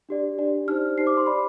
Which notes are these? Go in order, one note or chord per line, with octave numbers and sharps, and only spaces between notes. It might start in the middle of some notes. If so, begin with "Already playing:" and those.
D4 G4 D5
D4 G4 D5
D#4 G4 C5 F6
D#4 G4 C5 C7
D6
C6
G4 D5 B5